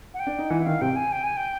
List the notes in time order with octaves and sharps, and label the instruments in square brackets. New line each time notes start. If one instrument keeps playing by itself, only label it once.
[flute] F#5
G5
[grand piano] D4
D#4
[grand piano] E3 E4 [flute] F#5
[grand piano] E4
[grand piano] D#3 D#4 [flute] F5
[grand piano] C3 C4 [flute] G5
[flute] G#5
G5
G#5
G5